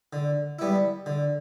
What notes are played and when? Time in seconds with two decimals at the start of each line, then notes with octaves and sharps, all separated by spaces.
0.13 D3
0.59 G3 B3 E4
1.06 D3